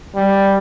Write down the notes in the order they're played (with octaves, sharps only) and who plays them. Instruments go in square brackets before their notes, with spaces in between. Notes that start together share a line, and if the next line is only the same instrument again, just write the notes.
[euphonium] G3